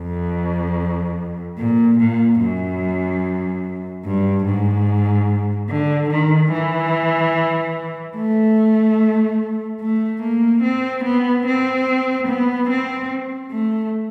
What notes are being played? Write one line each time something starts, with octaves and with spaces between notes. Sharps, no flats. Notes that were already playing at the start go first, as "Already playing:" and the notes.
Already playing: F2
A#2
A#2
F#2
G2
G#2
D3
D#3
E3
A3
A3
A#3
C4
B3
C4
B3
C4
A3